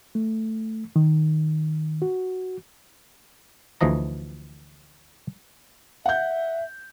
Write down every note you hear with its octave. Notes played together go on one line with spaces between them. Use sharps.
A3
D#3
F#4
D2 E3 F3 D#5 A#5
E5 F#5 G6